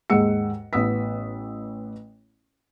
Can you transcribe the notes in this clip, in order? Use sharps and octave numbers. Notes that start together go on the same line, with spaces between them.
D#2 G#2 G#3 F#5 E6 C#7
A1 B3 D#6 E6 B6